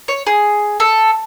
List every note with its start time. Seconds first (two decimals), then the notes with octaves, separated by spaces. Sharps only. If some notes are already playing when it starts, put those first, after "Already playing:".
0.08 C#5
0.27 G#4
0.80 A4